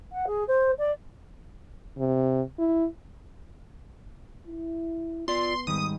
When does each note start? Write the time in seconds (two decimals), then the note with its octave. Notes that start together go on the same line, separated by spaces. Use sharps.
0.12 F#5
0.27 G#4
0.48 C5
0.78 D5
1.99 C3
2.59 E4
4.47 E4
5.28 B3 F4 D5 C6
5.67 G#2 D#3 G3 D#6